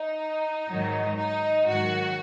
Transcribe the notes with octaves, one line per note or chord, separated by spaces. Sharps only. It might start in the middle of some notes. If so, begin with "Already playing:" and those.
Already playing: D#4
G#2 D#3 F#3
D#4
G#2 D#3 F#3 F#4